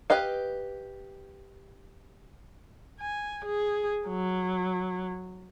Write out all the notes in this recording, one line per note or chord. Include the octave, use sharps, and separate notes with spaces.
G4 B4 D#5 F5
G#5
G#4
F#3